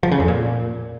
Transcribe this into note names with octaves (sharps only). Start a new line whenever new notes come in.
F3
C#3
F2
A#2